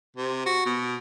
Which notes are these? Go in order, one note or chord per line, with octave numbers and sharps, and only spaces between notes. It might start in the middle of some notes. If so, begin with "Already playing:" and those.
C3
F#4
B2